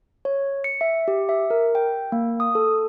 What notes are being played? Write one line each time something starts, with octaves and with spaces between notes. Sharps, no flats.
C#5
C#7
E5
G4
E5
A#4
G5
A#3
D#6
A4